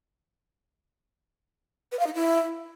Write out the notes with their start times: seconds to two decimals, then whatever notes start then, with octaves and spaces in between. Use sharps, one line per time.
1.92 B4
1.99 F5
2.07 D#4
2.14 E4